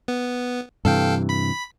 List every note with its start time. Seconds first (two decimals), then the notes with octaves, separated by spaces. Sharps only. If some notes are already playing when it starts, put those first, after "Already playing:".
0.08 B3
0.85 G2 C3 E3 A4 F5 G5
1.29 B5 B6